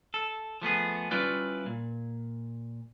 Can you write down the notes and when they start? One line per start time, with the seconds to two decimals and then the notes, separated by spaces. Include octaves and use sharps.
0.14 A4
0.62 F3 A3 B3 G#4
1.11 G3 C#4 E4 F4 B4 D5
1.66 A#2